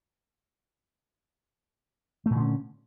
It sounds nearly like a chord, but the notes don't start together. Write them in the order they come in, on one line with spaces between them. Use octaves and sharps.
A3 A#2 D3 C#4